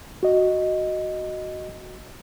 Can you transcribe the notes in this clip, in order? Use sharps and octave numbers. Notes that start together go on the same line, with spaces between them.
F#4 D#5